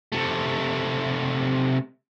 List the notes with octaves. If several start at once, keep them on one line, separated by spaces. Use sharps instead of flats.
C3 A3